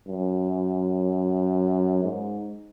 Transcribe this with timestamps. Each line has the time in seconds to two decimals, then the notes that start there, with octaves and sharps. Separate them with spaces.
0.08 F#2
2.04 G#2